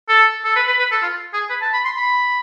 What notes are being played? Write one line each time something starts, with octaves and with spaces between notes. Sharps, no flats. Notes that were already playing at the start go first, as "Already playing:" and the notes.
A4
A4
B4
B4
B4
A4
F4
G#4
B4
A5
B5
C6
B5